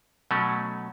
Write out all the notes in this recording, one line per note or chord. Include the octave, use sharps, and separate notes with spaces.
B2 F#3 A3 C#4